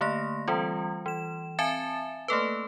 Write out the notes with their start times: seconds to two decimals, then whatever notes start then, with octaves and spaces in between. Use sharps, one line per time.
0.01 D3 A3 A#3 A#6
0.48 E3 G3 C4 F4
1.06 E3 E7
1.59 C4 E5 G#5 A5 A6 E7
2.28 A3 A#3 A4 B4